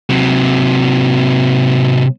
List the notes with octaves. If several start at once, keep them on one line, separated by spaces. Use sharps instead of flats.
C3 F#3